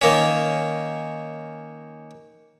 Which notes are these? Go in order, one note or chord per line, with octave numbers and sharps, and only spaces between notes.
D#3 A#3 C#4